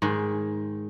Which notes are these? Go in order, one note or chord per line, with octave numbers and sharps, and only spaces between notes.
G#2 D#3 G#3